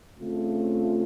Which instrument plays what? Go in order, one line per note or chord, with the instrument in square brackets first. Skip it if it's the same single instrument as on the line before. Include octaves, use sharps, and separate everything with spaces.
[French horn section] C#3 A3 C4 F4